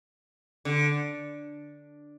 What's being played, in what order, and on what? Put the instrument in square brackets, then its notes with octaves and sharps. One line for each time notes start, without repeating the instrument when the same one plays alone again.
[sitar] D3